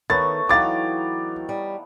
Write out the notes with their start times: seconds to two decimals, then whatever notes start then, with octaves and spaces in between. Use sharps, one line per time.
0.10 D#3 A3 B3 C#5 A6
0.49 E3 F#3 D#4 F5 G5 D6 A6
1.49 G3